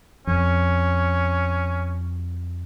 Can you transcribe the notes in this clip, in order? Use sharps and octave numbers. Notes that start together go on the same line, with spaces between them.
F2 C#4